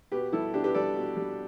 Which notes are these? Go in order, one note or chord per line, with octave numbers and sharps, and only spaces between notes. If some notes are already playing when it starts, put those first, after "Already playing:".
B2 G4 B4
G3 E4 A4
B2 D4 G4
G4 B4
G3 A4 D5
B2
G3